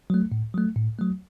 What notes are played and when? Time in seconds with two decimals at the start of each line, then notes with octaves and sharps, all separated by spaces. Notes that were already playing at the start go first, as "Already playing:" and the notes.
0.10 F#3 A3
0.32 A2
0.54 F#3 A3
0.76 A2
0.99 F#3 A3